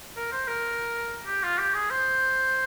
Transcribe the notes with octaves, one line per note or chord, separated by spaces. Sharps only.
A#4
C5
A#4
G4
F4
G4
G#4
C5